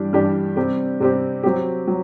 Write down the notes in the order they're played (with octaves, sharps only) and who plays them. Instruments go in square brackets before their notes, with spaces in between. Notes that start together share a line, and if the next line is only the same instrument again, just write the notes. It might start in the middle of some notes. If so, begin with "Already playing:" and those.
Already playing: [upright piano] G2 E3 G3 D4 G4
G2 E3 G3 D4 G4
C3 G3 C4 G4
C3 G3 C4 G4
F#3 C4 G4
F#3